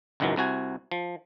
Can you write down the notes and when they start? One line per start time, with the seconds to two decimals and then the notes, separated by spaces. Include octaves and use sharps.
0.20 G#1 C#2 F#2 D#3 E3 F#3
0.36 C2 C3 F#4 G#5
0.91 F3